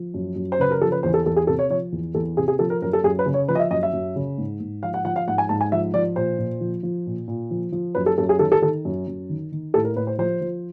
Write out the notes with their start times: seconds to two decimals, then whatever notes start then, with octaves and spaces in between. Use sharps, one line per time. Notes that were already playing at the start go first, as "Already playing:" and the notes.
Already playing: F3
0.14 F#2
0.36 F#2
0.52 C5
0.59 C#3 B4
0.71 A#4
0.81 F3 A4
0.92 B4
1.03 E2 C5
1.14 A4
1.26 E2 A4
1.36 G#4
1.47 C3 A4
1.59 C#5
1.70 F3 C#5
1.92 E2
2.15 E2 A4
2.37 C3 G#4
2.48 G#4
2.59 F3 A4
2.70 A#4
2.82 F#2 A#4
2.93 A4
3.04 F#2 G#4
3.19 B4
3.26 C#3
3.34 C#5
3.48 F3 B4
3.55 D#5
3.60 E5
3.71 F#2 D#5
3.83 E5
3.93 F#2
4.16 C#3
4.38 G#2
4.60 G#2
4.83 F3 F5
4.94 F#5
5.05 F3 F#5
5.16 F5
5.27 G#2 F#5
5.38 G#5
5.49 G#2 A5
5.61 G#5
5.72 F3 E5
5.94 F3 D5
6.16 A#2 C5
6.38 A#2
6.61 F3
6.83 F3
7.07 A#2
7.28 A#2
7.51 F3
7.72 F3
7.95 F#2 B4
8.06 A4
8.18 F#2 A4
8.29 G#4
8.39 D#3 A4
8.52 A4
8.62 D#3 A4
8.85 F#2
9.07 F#2
9.29 D#3
9.52 D#3
9.74 A2 A4
9.84 A#4
9.96 A2 B4
10.07 C5
10.18 F3 C5
10.41 F3